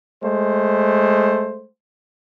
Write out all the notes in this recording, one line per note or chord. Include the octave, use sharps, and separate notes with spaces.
G#3 A3 C5